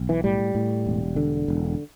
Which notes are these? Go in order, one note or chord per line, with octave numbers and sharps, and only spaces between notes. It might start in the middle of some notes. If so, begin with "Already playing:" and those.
Already playing: B1
E3
A2 G3
A2
E1
D3
E1